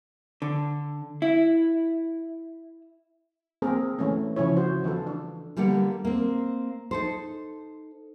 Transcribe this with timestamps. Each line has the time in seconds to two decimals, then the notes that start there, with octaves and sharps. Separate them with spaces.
0.42 D3
1.22 E4
3.62 A#3 C4 G#4 A#4
3.99 E3 A3 B3 C#4
4.36 C#3 F3 C#4 E4 C#5
4.57 F#4 C5
4.84 E3 B3 F4 A4
5.07 D4
5.57 D3 G3 A#3 B3 F#5
6.05 A#3 C4
6.91 D#4 A4 C5